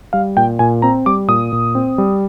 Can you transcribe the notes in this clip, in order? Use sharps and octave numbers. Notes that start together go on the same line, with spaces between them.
G3 F5
A#2 G5
A#2 G#5
C4 A#5
G3 D6
A#2 D#6
A#2
C4
G3